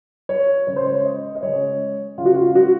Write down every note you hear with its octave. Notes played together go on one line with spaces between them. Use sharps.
C#5
C#3 G#3 C#5
C5
C#5
D#5
D#5
C#3 G#3 C#5
C#3 G#3 F4
F#4
F4
F#4